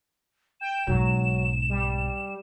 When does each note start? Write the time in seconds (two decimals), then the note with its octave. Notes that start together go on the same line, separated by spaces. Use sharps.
0.61 G5 E7
0.87 B1 G#2 F#3
1.69 G3